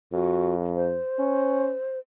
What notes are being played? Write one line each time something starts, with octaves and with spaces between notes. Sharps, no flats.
F2 F#4
C5
C#4